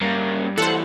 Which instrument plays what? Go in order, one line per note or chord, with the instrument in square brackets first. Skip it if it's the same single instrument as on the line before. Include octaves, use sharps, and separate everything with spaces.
[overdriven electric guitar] G2 [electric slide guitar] A#3 C#4 A#4
[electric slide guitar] E3 G3 [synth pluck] A4 C5 [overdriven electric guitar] F#5